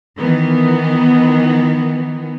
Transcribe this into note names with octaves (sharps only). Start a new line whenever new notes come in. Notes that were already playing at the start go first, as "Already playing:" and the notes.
D#3 E3 B3